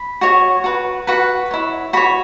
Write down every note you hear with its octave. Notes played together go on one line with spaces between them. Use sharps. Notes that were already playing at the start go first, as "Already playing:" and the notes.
Already playing: B5
F#4 C#5
F#4 B4
F#4 B4 F#5
E4 C#5
F#4 C#5 B5